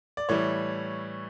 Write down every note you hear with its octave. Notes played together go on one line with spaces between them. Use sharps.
D5
A2 E3 G3 C#5